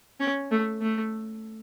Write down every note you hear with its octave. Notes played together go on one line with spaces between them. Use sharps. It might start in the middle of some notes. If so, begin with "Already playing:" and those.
C#4
A3
A3